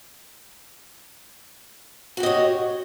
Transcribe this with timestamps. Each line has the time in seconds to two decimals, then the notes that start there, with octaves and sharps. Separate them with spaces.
2.17 F#4
2.20 G4
2.23 D#5
2.26 C#5